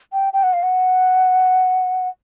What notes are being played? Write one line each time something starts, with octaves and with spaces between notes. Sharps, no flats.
G5
G5
F#5
F5
F#5